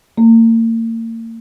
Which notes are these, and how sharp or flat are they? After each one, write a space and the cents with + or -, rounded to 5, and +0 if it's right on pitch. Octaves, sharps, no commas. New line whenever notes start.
A#3 -40